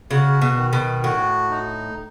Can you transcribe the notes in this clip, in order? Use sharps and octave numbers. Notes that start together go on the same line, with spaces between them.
C#3 F#4
B2
D#3
B2
A2 F#4
D#4